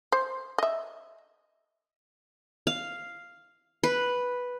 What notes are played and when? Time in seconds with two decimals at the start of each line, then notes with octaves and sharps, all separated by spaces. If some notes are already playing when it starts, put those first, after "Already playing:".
0.12 C5
0.58 D#5 E5
2.67 F5
3.83 B4